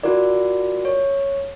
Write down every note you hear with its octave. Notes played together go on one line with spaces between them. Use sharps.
F4 F#4 A#4 D5
C#5